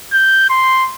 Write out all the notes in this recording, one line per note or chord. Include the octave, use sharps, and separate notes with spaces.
G6
C6